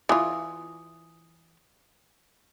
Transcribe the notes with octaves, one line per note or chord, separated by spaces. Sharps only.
E3 F4 G#5 D#6